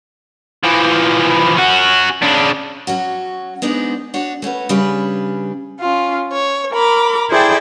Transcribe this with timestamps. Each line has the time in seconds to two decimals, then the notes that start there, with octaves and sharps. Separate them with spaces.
0.63 E3 F3
1.57 C#4 F#4
2.22 C#3 D4
2.87 F#3 C#4 F#4
3.62 G#3 B3 C4 D4 D#4
4.14 D4 F#4 C#5
4.42 A3 C#4 F#4 B4
4.69 C#3 G3 C#4 D4 B4
5.80 C#4 F4
6.33 C#5
6.73 A#4 B5 D6
7.30 E4 G#4 A4 C5 D5 G5